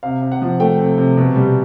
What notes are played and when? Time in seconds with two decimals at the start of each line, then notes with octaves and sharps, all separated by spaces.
0.03 C3 F5
0.22 C3
0.32 F#5
0.42 F3
0.60 A3 G5
0.79 C3
0.98 C3
1.17 B2
1.36 G3